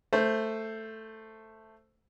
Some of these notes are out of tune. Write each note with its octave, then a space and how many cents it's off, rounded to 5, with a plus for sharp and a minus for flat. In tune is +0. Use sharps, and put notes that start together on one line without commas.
A3 +5 C5 +0